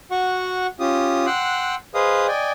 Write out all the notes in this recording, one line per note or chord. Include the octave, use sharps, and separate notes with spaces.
F#4 F#5 C#6
C#4 F4 G4 D#6
F#5 G5 C6 E6 F#6
G#4 B4 C5 D#5 F5 D#6
D5 D#5 G5 G#5